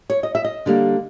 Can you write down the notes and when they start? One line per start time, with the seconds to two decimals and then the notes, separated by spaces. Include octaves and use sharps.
0.10 C#5
0.23 D#5
0.35 E5
0.44 D#5
0.66 D3 G3 A#3